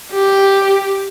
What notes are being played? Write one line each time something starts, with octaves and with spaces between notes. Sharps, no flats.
G4